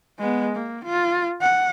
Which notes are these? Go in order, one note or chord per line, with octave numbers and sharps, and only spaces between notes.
G#3 B3
A#3
F4
F#5